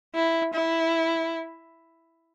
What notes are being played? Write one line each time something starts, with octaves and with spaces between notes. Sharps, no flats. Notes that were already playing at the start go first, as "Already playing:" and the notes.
E4
E4